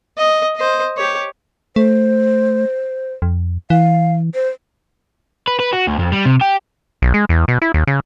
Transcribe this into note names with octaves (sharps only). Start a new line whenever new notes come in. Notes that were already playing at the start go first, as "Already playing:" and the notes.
D#5
C5 D#5
G4 C#5
A3 C5
F2
E3 F5
C5
B4
B4
F#4
D2
F2
G3
C3
G4
B1
G#3
E2
B2
E4
D#2
C#3